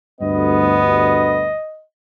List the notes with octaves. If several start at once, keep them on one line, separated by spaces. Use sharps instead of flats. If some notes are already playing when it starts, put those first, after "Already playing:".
D2 G2 B3 D#5